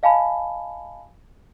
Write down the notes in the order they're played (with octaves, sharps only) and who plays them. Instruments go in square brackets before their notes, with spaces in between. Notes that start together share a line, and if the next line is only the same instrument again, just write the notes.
[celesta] D#5 F5 G#5 A5 B5